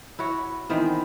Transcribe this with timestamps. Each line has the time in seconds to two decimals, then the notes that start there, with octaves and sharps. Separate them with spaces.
0.19 E4 F#4 C#5
0.70 D#3 E3 B3 C4